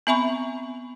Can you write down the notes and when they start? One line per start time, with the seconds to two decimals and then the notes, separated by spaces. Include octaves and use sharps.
0.07 B3 C4 E5 G#5 B5 C#6